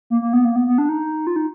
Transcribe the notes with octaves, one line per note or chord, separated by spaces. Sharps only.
A#3
A#3
B3
A#3
B3
B3
D4
D#4
F4
D#4